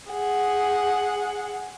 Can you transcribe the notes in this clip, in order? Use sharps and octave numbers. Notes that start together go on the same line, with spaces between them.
G#4 F#5